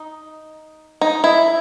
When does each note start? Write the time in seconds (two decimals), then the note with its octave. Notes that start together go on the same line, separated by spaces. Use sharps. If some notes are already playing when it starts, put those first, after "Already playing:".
Already playing: D#4
1.01 D#4
1.24 E4